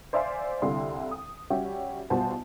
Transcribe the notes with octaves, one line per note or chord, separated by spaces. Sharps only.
C5 D5 E5 F5 G#5 C6
C2 D3 G3 E4 F5 C6
D#6
G3 C#4 F#4 G4 E5
B1 G3 F4 F#4 C5 A5